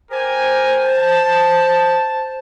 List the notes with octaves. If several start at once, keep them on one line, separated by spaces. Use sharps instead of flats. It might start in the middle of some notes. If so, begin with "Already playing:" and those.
G4 A#4 C5 G#5
A5